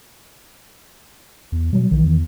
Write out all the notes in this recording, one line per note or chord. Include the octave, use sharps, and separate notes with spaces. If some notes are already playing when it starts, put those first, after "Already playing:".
E2
B2 F#3 G3
B1 D#3 E3
E2